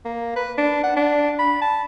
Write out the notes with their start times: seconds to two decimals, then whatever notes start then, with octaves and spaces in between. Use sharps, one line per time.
0.05 A#3
0.36 B4
0.58 D4
0.84 F#5
0.96 D4
1.39 B5
1.62 A5